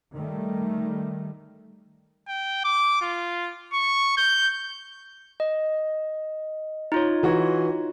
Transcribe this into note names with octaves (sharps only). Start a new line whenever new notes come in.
D#3 G3 A3
G5
D6
F4
C#6
G6
D#5
D#4 F4 C#5
E3 F#4